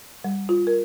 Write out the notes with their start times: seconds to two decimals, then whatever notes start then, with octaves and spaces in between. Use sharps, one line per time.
0.24 G3
0.49 F4
0.67 A#4